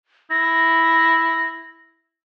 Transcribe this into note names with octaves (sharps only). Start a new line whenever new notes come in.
E4 A#6